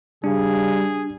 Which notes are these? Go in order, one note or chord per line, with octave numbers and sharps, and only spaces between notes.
C#3 G3 D4 G#4